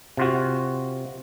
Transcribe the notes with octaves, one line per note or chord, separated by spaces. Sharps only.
C3 F4 F#4